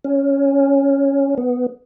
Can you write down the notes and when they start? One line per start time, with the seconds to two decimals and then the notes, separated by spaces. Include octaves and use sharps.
0.04 C#4
1.38 B3